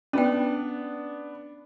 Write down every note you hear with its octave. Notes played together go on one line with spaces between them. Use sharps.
B3 C#4 D4 G5